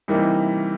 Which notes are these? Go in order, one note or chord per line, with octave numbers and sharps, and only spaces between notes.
C3 E3 G3 A#3 D#4